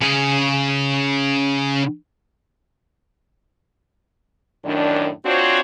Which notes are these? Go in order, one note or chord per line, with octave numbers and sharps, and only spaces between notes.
C#3 G#4
F#2 A2 D#3 D4
C4 D4 F4 F#4 C5 C#5